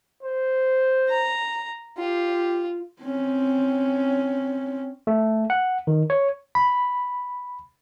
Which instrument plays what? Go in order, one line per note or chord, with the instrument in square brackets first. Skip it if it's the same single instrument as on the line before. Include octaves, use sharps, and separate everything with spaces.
[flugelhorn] C5
[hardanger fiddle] A#5
[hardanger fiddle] F4 [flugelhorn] G4
[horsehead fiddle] C4 C#4
[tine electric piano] A3
F#5
D#3
C#5
[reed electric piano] B5